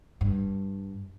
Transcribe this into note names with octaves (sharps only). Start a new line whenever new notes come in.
G2